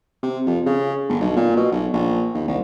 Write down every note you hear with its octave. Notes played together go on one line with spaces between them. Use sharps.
C3
F2
C#3
G1
B1
A#2
B2
B1
A#1
D#2
C2